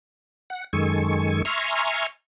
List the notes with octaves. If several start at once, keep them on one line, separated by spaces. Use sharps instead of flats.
F#5
F#2 D#3 G#3 A4 G#5 C#6
E5 G#5 A#5 C6 C#6 F6